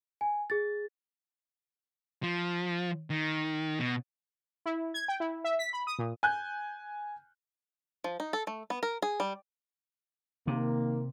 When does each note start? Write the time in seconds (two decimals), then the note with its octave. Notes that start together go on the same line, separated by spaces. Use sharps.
0.21 G#5
0.50 G#4 A6
2.23 F3
3.10 D#3
3.79 B2
4.66 E4
4.94 G#6
5.08 G5
5.20 E4
5.44 E5
5.59 B6
5.73 B5
5.87 D#6
5.99 A#2
6.23 G#5 F#6 G6
8.04 F3
8.20 D#4
8.33 A4
8.47 A3
8.70 B3
8.83 A#4
9.02 G#4
9.20 G3
10.47 C3 D#3 A#3